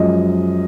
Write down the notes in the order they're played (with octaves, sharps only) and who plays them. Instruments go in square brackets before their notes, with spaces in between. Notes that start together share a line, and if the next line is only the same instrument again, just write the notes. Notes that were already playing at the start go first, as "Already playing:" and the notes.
Already playing: [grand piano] F#2 F3 G#3 D#5